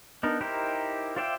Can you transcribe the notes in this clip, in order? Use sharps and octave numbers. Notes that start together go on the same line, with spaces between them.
B3 D4 D#4 A#4
D#4 E4 G4 A#4 C5
F4 C5 D5 E5 G5